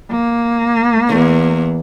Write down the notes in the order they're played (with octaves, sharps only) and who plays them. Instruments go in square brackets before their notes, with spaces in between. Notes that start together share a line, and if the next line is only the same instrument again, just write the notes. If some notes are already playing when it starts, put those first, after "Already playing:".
[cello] A#3
[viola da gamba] E2